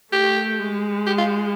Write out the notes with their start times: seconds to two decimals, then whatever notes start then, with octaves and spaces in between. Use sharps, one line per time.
0.12 A3 G4
0.59 G#3
1.06 G4
1.18 F4